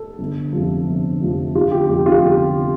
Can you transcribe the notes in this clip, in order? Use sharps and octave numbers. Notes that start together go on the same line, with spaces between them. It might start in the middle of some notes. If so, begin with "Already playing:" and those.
Already playing: A4
G1
F2 C3 F3
G1
F2 C3 F3
G1 F4
G4
F2 C3 G4
F4
G1 G4
C3